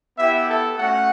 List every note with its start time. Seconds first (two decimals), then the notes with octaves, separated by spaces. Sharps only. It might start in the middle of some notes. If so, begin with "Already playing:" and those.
0.17 B3 E4 G4 E5
0.48 A4
0.78 A3 C#4 F#4 F#5